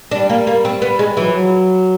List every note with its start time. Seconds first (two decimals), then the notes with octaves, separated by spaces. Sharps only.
0.11 G3 D4
0.29 A#3
0.47 A#3
0.65 C4
0.82 B3
0.99 G#3
1.16 E3 F#3
1.24 F3
1.31 F#3